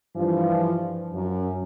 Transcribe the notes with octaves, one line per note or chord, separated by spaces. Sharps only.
G2 E3 F3
F#2